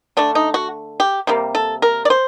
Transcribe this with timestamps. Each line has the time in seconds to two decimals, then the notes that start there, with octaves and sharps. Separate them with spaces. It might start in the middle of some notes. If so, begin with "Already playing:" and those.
0.17 D3 A3 D4
0.35 D#4
0.54 F#4
1.00 G4
1.27 C3 G3 A#3
1.55 A4
1.82 A#4
2.05 D5
2.10 C5